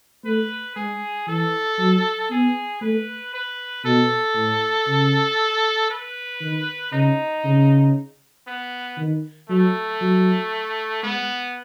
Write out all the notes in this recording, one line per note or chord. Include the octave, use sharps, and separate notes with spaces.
A3 B4
G#3 G#4
E3 A4
F#3
B3 G#4
A3 B4
B4
B2 A4
A2
C#3
B4
D#3
C#3 D#4
C#3
B3
D#3
F#3 A3
F#3
G#3 B3